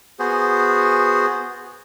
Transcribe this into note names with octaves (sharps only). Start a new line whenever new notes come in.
B3 F#4 G#4 C5